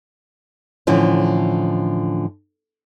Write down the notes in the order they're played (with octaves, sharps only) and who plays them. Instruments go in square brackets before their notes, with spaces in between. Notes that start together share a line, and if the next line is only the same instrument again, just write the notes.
[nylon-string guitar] A2 D3 E3 F3 C#4 E4